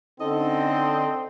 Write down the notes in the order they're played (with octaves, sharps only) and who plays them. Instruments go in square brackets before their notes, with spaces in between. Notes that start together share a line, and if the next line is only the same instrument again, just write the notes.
[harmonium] D3 [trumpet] C4 [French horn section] C#4 D#4 [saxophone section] A4 D#5